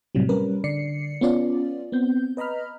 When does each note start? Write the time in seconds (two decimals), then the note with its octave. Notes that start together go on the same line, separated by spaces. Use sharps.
0.15 A2 C3 F#3 G3
0.29 G3 C#4 A#4 B4
0.64 D3 D5 C7 C#7
1.21 B3 C#4 F4 D5
1.92 B3 C4 G6
2.37 B4 D#5 A#5 B5 F6